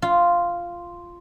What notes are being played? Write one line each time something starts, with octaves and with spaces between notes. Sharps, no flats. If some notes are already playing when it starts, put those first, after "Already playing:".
F4